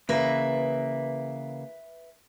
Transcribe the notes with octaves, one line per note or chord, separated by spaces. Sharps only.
C#3 E3 A#3 B4 E5